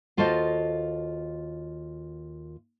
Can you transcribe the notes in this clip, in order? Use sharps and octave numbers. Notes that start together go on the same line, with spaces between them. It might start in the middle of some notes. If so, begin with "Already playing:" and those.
D#2 F4 F#4 A4 C5 D#5